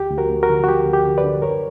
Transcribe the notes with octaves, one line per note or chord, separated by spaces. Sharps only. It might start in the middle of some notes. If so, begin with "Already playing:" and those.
Already playing: D2 G4
D2
F#4 A#4
D2
F#4 A#4
D3
F#4
D2 G4
D2
G4
D3
B4 D5
D3
F#2 A#4 C#5